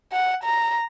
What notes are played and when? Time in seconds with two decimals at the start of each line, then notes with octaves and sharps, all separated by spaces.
0.13 F#5
0.44 A#5